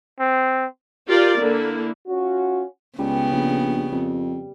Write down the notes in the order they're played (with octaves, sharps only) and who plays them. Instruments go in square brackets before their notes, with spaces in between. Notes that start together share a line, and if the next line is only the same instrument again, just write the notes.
[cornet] C4
[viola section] F4 G4 A#4 D5
D3 A#3 E4
[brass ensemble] C#4 F4 F#4
[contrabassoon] C#2 [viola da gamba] C#3 B3 [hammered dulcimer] G3
[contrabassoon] A#1
F2